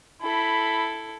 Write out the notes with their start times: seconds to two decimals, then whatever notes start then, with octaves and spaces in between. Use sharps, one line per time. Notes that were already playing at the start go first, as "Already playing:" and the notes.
0.22 E4 A4 B5